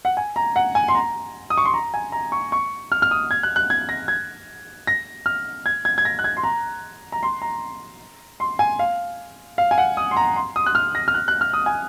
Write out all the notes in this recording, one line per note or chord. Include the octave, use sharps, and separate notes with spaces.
F#5
G#5
A#5
F#5
G#5
C6
A#5
D#6
C#6
C6
A#5
G#5
A#5
C#6
C#6
F6
F6
D#6
G#6
F#6
F#6
G#6
A#6
G#6
A#6
F6
G#6
G#6
G#6
A#6
F#6
G#6
C6
A#5
A#5
C6
A#5
C6
G#5
F5
F5
G#5
F#5
D#6
C6
A#5
C6
D#6
F#6
F6
A#6
F6
F#6
F#6
F6
D#6
G#5